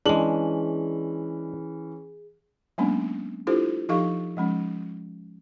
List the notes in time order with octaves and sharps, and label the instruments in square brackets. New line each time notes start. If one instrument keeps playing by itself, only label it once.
[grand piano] E3 C#4 F#7 [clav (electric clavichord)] G#3 D4 [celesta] G#4
[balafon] F#3 G#3 A#3 B3 C#4 D4
D4 E4 F4 G4 A4 C5
F3 D#4 G4 A4 F5 C#6
F3 G#3 C#4